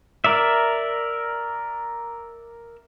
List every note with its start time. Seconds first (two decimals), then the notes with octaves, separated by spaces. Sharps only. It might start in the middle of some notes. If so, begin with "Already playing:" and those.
0.24 A#4 D5 E5